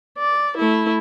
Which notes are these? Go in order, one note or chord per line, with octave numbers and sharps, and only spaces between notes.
D5
A3 E4